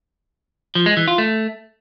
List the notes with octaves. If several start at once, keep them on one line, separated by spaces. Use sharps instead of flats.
F3
G#3
E3
F4
A3